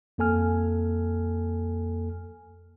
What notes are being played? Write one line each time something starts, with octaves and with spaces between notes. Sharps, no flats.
F2 A#3 A4 G#5 F6